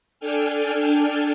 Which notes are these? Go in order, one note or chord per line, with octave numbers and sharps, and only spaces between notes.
D4 A4 G5 G#5 F6